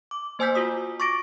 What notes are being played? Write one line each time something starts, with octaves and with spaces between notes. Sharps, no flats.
D6
A#3 C5 G#5 E6 G6 B6
F4 F#4 D#6
C#6 D6 A6 A#6 D7